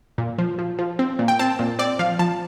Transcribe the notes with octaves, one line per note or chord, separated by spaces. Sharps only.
A#2
F3
F3
F3
C4
A#2
G5
C4 A5
A#2
C4 D5
F3 F5
F3 A5